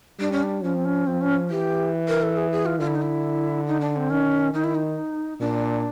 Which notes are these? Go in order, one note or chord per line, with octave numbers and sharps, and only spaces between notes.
G3 D4
C#4
D4
F3 C#4
C4
C#4
F3 C4
C#4
E3 G4
A#4
A4
G#4
G#4
F4
D3 F4
E4
D#4
E4
D#4
D4
C4
D#3 C#4
D#3 D#4
E4
D#4
A#2 D4